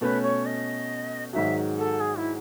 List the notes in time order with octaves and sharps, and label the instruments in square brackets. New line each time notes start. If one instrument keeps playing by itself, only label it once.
[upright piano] B2 A3 C#4 [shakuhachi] B4
[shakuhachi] C#5
D#5
[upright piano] G#2 D#3 F#3 [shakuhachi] E5
[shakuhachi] A4
G#4
E4